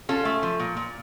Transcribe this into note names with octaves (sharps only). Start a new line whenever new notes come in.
C#4 F4 A4
A3
F3
A#2
A#2